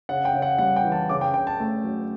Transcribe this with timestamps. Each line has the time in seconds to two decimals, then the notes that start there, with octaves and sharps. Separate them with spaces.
0.09 C#3 F#5
0.25 G5
0.34 C#3
0.42 F#5
0.58 G3 F#5
0.76 G5
0.84 E3
0.92 A5
1.09 C#3 D6
1.21 G5
1.34 C#3 G5
1.47 A5
1.60 A3
1.84 F#3